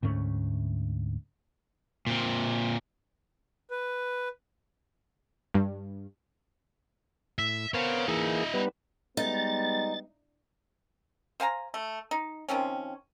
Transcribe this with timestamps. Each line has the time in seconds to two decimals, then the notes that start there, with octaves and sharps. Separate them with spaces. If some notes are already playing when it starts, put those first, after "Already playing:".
0.03 D2 G#2 A3 C#4
2.07 A#2 C4
3.70 B4
5.54 G2
7.39 A2 E5
7.74 B3 A#4 C5 C#5 F5
8.08 E3 A#3 D#4 G#4 E5
8.54 G3 B3 B4
9.17 G3 G#3 B3 D#4 A6
11.40 C5 F5 G#5 A#5
11.74 A3
12.11 D#4
12.49 D#3 F3 C4 C#4